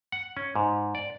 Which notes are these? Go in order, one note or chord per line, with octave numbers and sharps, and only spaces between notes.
F#5
C#4
G#2
D5